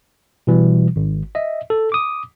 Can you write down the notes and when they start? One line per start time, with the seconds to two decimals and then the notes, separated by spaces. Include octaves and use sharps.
0.47 B2 E3 G3
0.96 G#1
1.35 D#5 E5
1.70 A4
1.92 D6 D#6